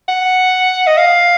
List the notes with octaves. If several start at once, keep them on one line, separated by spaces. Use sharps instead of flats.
F#5
D#5
F5